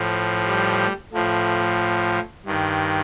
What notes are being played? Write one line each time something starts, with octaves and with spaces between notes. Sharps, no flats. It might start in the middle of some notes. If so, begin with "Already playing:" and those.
Already playing: A2 F3
G3
A2 F3 A3
G2 D#3